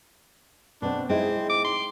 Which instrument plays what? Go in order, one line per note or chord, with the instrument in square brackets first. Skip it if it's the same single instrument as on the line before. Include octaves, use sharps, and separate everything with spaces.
[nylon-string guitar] B2 C4 [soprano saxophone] D4
[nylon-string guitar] G#3 D#4 E4 [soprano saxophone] C4
[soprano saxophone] D6
C6